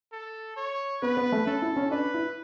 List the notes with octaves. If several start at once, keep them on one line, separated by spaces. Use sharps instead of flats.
A4
C#5
B3 B4
B3
A3
C#4 A4
E4
C#4
D4 B4
E4